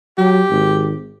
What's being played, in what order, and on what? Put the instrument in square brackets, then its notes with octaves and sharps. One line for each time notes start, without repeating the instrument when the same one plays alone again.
[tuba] F#3 [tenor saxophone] G4
[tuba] G#1